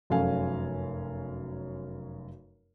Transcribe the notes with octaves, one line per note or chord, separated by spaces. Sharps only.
F1 F#2 C#4 A4 F5 G#5